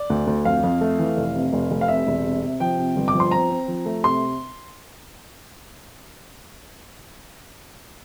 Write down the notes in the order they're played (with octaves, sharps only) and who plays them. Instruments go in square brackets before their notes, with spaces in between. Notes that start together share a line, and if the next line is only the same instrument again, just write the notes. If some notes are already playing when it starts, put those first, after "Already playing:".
Already playing: [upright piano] D5
D2
D2
F2 F5
F2
A3
E3
F1
C3
F1
F1
F5
C3 E5
E1
C3
C3
F3 G5
C3
G1
D6
F3
C6
C4 A#5
C4
F3
A3
C3 C6